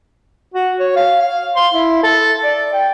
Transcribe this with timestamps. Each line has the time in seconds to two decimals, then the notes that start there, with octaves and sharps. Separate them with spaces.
0.54 F#4
0.80 C#5
0.96 F5
1.21 F5
1.56 C6
1.73 E4
2.04 A4
2.43 D5
2.73 G5